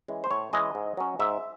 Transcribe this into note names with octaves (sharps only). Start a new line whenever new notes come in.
E3 G#3 C#4
C5
A2 C#5
E3 G#3 C#4 D#5
G#2
F#3 C#4
G#2 E5